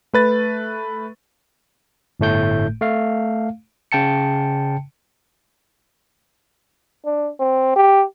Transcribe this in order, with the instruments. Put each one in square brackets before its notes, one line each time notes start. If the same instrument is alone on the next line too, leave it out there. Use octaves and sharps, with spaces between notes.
[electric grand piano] A3 B4 A6
[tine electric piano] G1 A2 A3 G6
A3 F5
C#3 G5 A5 C#7
[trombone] D4
C4
G4